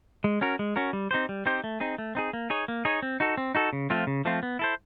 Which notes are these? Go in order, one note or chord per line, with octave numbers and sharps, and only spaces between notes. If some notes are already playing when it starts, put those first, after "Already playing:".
G#3
C#4 F#4 A#4
G#3
C#4 F#4 A#4
G3
C4 D#4 G4 C5
G3
C4 D#4 G4 C5
A3
C4 D#4 G#4
A3
C4 D#4 G#4
A#3
D#4 G#4 C#5
A#3
D#4 G#4 C#5
C4
D#4 F#4 A4
C4
D#4 F#4 A4
C#3
F3 A3 C4 F4
C#3
F3 A3 C4 F4
B3
E4 A4 C5